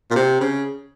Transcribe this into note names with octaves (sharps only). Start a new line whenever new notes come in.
A#2
C3
C#3